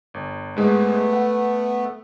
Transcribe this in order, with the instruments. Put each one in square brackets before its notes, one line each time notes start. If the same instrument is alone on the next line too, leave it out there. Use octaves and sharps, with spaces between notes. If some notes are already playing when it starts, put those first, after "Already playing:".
[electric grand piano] G1
[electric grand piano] G#2 G#3 [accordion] A3 B3
[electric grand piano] F#5